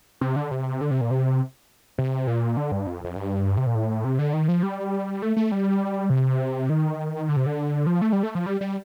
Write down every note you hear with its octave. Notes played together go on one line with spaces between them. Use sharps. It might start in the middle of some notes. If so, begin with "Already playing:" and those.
C3
D3
C3
D3
C3
A#2
C3
C3
A#2
D3
G2
F2
F2
G2
C3
A#2
A2
C3
D3
D#3
F3
G3
A3
A3
G3
C3
D#3
D3
C3
D3
F3
A3
G3
A3
F3
G3
G3